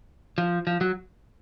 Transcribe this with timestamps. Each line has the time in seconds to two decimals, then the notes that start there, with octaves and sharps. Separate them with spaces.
0.38 F3
0.67 F3
0.81 F#3